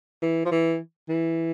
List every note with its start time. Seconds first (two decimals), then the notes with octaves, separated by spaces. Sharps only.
0.22 E3
0.45 F3
0.51 E3
1.09 E3